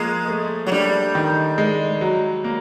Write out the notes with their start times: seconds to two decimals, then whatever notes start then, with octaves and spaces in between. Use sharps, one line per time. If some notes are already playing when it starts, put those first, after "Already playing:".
Already playing: F3 G#3 A#3
0.28 A3
0.67 F#3
0.72 G3 D4
1.15 D#3
1.58 G#3
2.01 F#3
2.44 A#3